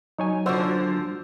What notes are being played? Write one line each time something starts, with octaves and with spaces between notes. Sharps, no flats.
F#3 D#4 C#5 G#5
D3 F3 A#3 F#4 C5 E6